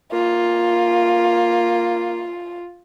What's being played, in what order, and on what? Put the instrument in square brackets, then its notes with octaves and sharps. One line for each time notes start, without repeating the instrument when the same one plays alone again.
[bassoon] A#3 [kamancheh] F4